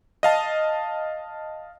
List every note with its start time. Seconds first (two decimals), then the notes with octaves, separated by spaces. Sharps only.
0.23 D#5 F5 A5